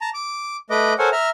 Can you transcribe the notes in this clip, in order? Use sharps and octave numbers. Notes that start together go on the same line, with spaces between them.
A5 A#5
D6
A3 B4 D#5 D6
A4 A#4 C5 C#5 F#5 G#5
E5 A#5 F6